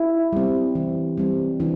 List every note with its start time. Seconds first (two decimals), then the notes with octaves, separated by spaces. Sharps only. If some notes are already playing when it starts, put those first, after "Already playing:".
Already playing: E4
0.33 G3 C4
0.75 E3
1.18 G3 C4
1.60 E3 D4